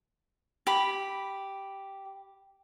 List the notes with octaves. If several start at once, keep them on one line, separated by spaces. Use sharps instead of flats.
G4 B5